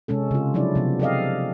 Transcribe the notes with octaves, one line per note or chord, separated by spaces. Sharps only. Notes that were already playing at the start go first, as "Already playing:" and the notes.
C3 G#3 C#4 A4
C#3 F4
F3 F#3 D4 E4 D5
C3 F3 B3
G4 A4 D5 D#5 F5